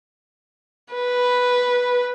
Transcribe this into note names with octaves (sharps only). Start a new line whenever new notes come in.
B4